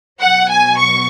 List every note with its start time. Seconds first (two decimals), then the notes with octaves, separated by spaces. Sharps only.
0.21 B2 F#3 F#5
0.50 G#5
0.78 C#6